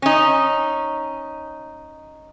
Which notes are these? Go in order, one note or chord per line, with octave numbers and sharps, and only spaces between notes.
C#4 D#4